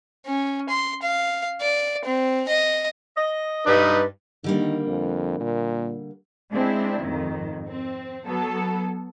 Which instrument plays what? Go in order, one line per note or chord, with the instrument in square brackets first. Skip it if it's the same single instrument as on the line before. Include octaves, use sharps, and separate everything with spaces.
[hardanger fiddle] C#4
C6
F5
D5
C4
D#5
[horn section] D#5
[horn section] G2 [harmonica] D#4 B4
[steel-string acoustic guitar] D3 G3 A#3 [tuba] D#3
[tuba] F2
A#2
[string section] G#3 C4 D4 E4
F2 G#2 D#3
C4
F#3 B3 A4